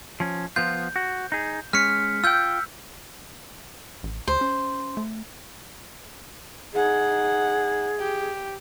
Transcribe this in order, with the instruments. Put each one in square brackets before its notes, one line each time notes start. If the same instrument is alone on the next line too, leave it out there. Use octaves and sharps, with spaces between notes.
[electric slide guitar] F3 C#4
[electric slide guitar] F3 B3 F4 [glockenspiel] G6
[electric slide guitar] F#4
D#4 G#4
[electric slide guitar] G#3 C#4 [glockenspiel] F6 B6 C#7
[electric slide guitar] F4 G5 [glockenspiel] E6 G6
[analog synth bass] A1
[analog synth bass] D2 [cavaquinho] C5
[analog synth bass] C#4
A3
[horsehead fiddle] D#4 F#5 [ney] G#4
[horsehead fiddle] G4